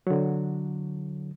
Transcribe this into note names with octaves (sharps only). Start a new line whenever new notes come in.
D3 F#3